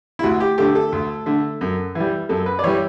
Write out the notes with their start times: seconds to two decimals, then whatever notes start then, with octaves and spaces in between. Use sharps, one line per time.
0.19 E4
0.23 D2 F#4
0.40 G4
0.58 D3 A3 G4
0.75 A4
0.92 D2
1.26 D3 A3
1.61 F#2
1.95 E3 G3
2.29 F#2 A4
2.46 B4
2.59 D5
2.64 E3 G3 C#5